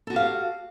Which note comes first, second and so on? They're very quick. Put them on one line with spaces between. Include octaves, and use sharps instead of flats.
A4 F#4 G4 F5